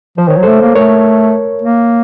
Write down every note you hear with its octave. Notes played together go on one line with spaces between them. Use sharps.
F3 C5
D#3
C#5
F#3
A3 A4 C5
A#3
A3 A#4 C#5
A#3